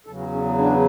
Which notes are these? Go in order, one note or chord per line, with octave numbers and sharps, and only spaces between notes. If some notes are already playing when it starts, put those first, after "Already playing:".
E2 C#3 F#3 A4
F#4
C#4
B3
D4